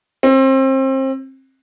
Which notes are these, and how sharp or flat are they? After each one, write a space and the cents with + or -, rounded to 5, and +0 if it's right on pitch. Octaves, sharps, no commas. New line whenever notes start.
C4 +30